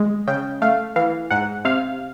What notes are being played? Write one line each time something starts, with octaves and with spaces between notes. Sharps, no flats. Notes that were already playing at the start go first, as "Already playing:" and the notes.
Already playing: G#3
C#3 G5
A3 F5
E3 F5
G#2 F#5
C3 F5